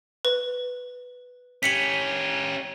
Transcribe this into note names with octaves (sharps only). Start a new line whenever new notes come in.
B4
C#4 G4 B6 C#7 F#7